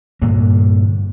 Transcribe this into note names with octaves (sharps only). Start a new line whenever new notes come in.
G2 A#2 D3 A#3